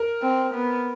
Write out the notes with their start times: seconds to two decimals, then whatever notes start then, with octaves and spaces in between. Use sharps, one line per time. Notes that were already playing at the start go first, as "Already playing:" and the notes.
Already playing: A#4
0.22 C4
0.54 B3